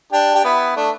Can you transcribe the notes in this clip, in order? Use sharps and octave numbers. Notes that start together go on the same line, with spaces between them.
D4 G4
G4
B3 E4
A3 D4